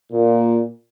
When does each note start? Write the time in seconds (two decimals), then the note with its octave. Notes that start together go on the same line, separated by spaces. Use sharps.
0.12 A#2